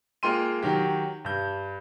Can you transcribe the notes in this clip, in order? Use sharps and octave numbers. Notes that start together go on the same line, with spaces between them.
G#3 A#3 F4 G5 C6 D#7
D#3 F#3 G4
G2 G6